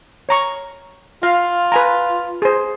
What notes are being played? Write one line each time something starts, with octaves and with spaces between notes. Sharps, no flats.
C#5 A#5 C#6
F4 F5
B4 G#5 A#5
G#4 C5